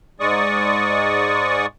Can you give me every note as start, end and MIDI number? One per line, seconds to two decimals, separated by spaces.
0.20 1.66 44
0.20 1.66 56
0.20 1.66 74
0.20 1.66 85
0.20 1.66 87